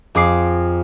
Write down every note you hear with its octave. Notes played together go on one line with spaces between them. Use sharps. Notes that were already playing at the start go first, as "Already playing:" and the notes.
F2 G#4 D6 C7